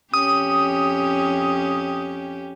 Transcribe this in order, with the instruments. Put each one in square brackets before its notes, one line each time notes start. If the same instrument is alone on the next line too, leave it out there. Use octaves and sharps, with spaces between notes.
[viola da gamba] F2 C#4 G4 [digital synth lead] D#6